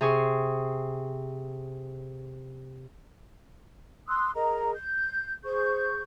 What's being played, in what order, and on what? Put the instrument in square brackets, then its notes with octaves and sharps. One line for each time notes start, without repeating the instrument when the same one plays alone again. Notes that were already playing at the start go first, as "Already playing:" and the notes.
[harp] C3 G#4 C#6
[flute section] C6 D#6 E6 F#6
G#4 A#4 D#5 A#5
G6
G#4 C5 C#6 G6